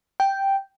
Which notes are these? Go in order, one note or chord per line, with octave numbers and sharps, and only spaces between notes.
G5